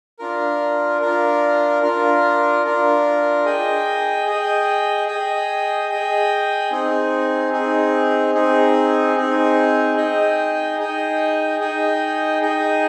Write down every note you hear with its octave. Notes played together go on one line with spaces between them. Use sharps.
D4 F4 A#4
D4 F4 A#4
D4 F4 A#4
D4 F4 A#4
G#4 D#5 G5
G#4 D#5 G5
G#4 D#5 G5
G#4 D#5 G5
C4 D#4 G#4
C4 D#4 G#4
C4 D#4 G#4
C4 D#4 G#4
D#4 G#4 D#5 G5
D#4 G#4 D#5 G5
D#4 G#4 D#5 G5
D#4 G#4 D#5 G5